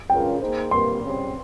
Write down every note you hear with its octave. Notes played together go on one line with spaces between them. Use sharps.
C#3 G#3 C#4 F4 A#4 G5
A#3 D#4 G#4 C5
C3 G3 A#3 C6
C#3 G3 C4